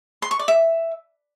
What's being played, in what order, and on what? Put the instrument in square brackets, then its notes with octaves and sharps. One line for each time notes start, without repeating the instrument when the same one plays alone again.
[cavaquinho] C6
C#6
D5
E5